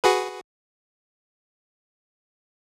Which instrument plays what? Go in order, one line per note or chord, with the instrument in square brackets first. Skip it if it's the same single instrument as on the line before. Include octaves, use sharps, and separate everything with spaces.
[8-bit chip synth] F#4 G#4 B4